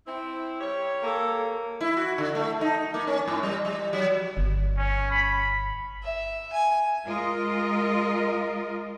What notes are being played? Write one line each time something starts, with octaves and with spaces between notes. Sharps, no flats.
C4 E4
G3 G4 C#5
A#3 A4
E4
F#4
D3
A3
D#4
A#3
C#4
G#2
G3
G3
F#3
G1
C#4
B5
E5
G#5
G#3 F4 A#4 D#5